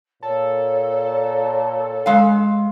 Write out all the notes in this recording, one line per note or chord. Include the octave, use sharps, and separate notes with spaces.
A#2 A4 C#5
G#3 F5